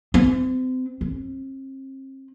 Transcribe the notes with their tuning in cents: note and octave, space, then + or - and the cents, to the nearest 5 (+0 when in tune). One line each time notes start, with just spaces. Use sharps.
C4 -35
C4 +40